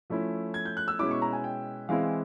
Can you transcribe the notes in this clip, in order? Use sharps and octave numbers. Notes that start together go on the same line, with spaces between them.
F3 A3 C#4 E4
G#6
G6
F#6
E6
B2 G#3 C#4 E4 D6
C#6
A#5
G#5
G5
E3 G#3 C4 E4 F5